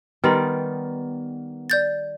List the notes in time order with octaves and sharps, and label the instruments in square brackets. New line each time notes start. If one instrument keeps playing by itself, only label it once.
[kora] D#3 G3 D#4 [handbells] B3 [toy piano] B4 D#5 C6
[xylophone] D5 G6 A6